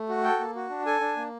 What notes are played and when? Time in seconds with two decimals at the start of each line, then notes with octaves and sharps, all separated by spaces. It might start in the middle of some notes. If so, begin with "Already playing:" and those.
Already playing: A3
0.09 F#4
0.23 A4 G5
0.40 A#3
0.55 F#4
0.70 D4
0.86 A4 G#5
1.00 D4
1.17 A#3